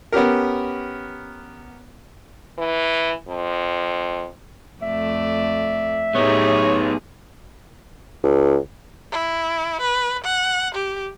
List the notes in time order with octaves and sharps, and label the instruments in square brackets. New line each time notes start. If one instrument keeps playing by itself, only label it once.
[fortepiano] B3 C#4 G4 A#4
[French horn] E3
F2
[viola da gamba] F2 A3 D5 [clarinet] E5
[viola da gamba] A2 G4 G#4 [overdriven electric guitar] B3 D#4 [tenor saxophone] C#5
[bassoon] C#2
[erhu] E4
B4
F#5
G4